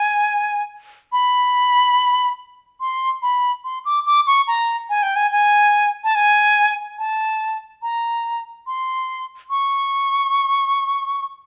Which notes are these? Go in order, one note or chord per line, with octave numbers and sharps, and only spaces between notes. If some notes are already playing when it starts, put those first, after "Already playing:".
Already playing: G#5
B5
C6
B5
C6
D6
D6
C#6
A#5
G#5
G5
G#5
G#5
A5
G#5
A5
A#5
C6
C#6